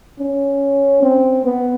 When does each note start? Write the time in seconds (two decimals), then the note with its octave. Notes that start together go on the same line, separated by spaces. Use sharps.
0.19 C#4
1.02 C4
1.45 B3